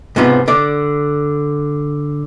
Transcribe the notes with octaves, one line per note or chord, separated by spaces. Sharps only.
G#2 C3 F3 B3 F4
D3 D5